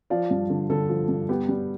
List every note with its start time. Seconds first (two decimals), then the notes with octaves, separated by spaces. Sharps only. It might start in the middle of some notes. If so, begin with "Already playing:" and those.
0.10 F3 D5 F5
0.31 G2
0.50 D3
0.70 D3 A4
0.89 F3
1.09 G2
1.29 B3 G4
1.49 G3